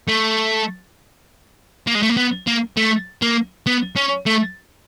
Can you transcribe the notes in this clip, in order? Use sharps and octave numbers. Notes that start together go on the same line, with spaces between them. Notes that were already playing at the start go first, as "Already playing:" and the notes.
A3
A#3
G#3
A3
A#3
B3
A#3
A3
A#3
B3
C#4
A3